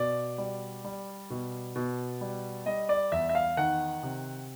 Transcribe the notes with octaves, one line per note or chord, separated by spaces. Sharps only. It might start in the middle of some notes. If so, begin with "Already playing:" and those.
Already playing: B2 D5
G3
G3
B2
B2
G3
G3 D#5
D5
E2 E5
E5
F5
D#3 F#5
C3